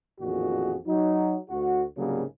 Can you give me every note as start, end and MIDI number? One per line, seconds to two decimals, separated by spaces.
0.20 0.76 33
0.20 0.76 41
0.20 0.76 46
0.20 0.76 51
0.20 0.76 66
0.20 0.76 68
0.87 1.37 54
0.87 1.37 63
1.50 1.84 38
1.50 1.84 66
1.97 2.23 36
1.97 2.23 44
1.97 2.23 49
1.97 2.23 54
1.97 2.23 55
1.97 2.23 58